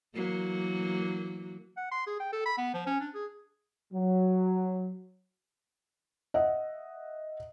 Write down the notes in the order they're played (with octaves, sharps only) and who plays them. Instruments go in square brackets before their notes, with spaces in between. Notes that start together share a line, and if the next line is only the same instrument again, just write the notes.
[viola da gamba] E3 F#3 A#3
[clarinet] F#5
C6
G#4
G5
A4
B5
B3
F3
C#4
D4
G#4
[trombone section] F#3
[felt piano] D#5 E5 F#5